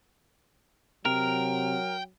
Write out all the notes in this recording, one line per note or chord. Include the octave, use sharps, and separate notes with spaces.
C3 F#3 A#4 G5